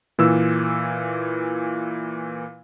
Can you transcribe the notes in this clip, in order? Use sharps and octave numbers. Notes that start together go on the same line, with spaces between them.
A#2 E3 E6